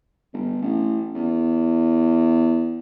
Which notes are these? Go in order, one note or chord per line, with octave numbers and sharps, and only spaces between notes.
G1
A1
E2